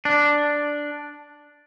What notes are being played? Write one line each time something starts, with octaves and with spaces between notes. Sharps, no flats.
D4